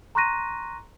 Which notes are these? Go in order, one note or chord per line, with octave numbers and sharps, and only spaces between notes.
A#5 C6 C#6 F#6 A#6 D#7